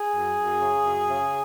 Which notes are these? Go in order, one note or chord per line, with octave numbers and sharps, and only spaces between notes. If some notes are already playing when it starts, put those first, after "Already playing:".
Already playing: G#4
F#2
F#2
C#3
F#2
C#3